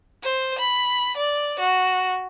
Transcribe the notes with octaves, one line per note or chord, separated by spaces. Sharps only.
C5
B5
D5
F#4